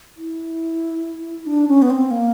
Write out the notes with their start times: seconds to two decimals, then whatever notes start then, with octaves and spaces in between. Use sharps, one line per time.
0.17 E4
1.47 D4
1.68 C#4
1.82 B3
1.90 C4
2.11 A#3